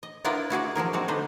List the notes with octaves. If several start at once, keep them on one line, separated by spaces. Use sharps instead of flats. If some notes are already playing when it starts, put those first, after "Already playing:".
D#5
B3 D4 E4 F4 A#4 B4
E4 F#4 G#4 D5
F3 F#3 G#4 A#4
G3 G#3 C4 F#4
D3 D4 D#4 B4 C5 D#5